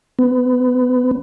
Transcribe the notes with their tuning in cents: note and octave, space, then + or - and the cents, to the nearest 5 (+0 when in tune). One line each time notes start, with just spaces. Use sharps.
B3 +25